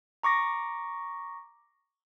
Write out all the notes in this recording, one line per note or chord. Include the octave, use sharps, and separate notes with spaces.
A#5 C#6 D6 A#6